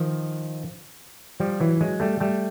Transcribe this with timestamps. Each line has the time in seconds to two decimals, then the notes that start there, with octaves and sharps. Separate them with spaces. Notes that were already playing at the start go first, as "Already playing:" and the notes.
Already playing: D#3 F3
1.40 F3 G3
1.60 E3 F#3
1.81 F#3 G#3
2.00 G3 A3
2.20 G3 A3